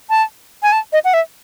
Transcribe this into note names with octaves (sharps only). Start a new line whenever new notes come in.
A5
G#5
A5
D#5
F#5
E5